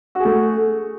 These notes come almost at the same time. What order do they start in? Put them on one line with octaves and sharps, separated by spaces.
F#4 G#4 A3